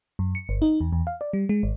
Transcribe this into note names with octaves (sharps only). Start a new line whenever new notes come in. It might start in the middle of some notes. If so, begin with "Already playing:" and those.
F#2
C#7
G1
D#4
E2
E2
F5
D5
G3
G#3
G#1